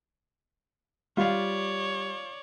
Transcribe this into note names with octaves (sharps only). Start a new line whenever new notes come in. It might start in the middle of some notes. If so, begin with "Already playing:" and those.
G3 F4 C#5 D5 F5